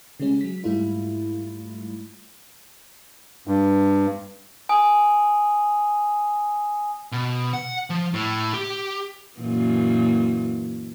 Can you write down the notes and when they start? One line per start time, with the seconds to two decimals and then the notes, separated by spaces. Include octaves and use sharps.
0.20 C#3 G3 G#3 C#4
0.41 F#3 B6
0.64 G#2 G3 A3 E4 F4
3.48 G2
4.69 G#5 D#6
7.12 B2
7.53 F#5
7.90 F3
8.14 A2
8.54 G4
9.38 F#2 A#2 E3